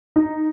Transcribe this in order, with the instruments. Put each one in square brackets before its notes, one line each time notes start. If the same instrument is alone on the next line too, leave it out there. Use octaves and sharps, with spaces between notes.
[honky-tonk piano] D#4